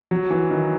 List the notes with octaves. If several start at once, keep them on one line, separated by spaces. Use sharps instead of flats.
F#3
E3
D#3